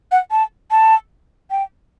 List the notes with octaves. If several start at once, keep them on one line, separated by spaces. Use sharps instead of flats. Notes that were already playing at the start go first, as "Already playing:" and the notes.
F#5
A5
A5
G5